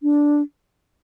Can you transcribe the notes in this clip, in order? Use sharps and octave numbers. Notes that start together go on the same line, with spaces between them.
D4